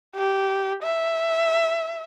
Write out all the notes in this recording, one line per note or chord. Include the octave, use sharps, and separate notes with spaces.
G4
E5